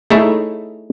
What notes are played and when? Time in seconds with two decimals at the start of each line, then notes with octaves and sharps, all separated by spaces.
0.10 A3 D#4 E4 G#4 C#5 E5